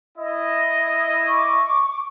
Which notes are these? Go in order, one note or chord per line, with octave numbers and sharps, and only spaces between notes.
E4 D#5
C#6 D6